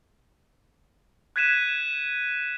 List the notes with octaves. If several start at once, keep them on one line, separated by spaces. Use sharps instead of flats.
F#6 G#6 B6 D#7 E7